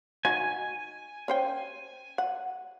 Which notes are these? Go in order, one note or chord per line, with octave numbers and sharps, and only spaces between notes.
D#4 F#4 G#5
C#4 C5 G5
F#5